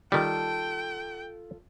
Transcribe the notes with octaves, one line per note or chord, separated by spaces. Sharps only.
D#3 G3 F4 A4 G5